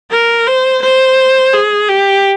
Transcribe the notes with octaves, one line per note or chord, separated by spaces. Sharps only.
A#4
C5
C5
G#4
G4